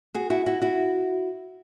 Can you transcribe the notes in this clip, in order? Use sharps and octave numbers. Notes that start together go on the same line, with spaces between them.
F#4 G#4
E4 F#4
E4 F#4
E4 F#4